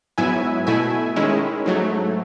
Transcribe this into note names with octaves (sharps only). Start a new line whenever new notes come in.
G#2 F#3 B3 E4 E5 G#5
B2 A3 E4 E5 G#5
D#3 G#3 C#4 E4
G#2 F#3 A3